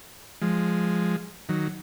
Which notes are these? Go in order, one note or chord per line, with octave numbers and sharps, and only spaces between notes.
F3 G#3
D#3 F#3